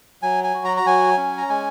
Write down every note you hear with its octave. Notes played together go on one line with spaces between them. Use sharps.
F#3 G#5
G#5
F#4
A#5
A#5
F#3 G#5
C#4
A#5
G#3 G#5